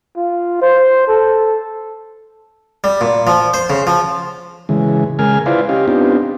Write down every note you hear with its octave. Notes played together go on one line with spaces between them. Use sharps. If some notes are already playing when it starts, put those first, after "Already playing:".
F4
C5
A4
G3
A#2
F3
C5
C#3
F3
C#3 E3 G#3
C#3 G#3 A#4 G#5 F6
E4 F4 B4 C5 D5 F5
C#4 G4 D#5 F5
B3 C4 D4 D#4 F4 G4